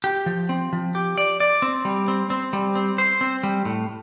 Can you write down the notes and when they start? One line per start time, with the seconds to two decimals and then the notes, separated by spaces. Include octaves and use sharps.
0.04 G4
0.26 F3
0.49 C4
0.73 F3
0.95 G4
1.18 D5
1.40 D5
1.62 C4
1.85 G3
2.08 C4
2.30 C4
2.53 G3
2.75 C4
2.98 C5
3.21 C4
3.43 G3
3.65 A2